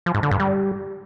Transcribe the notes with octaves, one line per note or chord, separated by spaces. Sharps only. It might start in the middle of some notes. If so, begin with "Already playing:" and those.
F3
G#2
D3
G2
G3